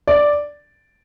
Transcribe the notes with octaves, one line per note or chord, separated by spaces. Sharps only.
D5